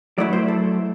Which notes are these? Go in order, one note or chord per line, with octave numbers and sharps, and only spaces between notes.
F#3 A3 E4 D5
C5
A4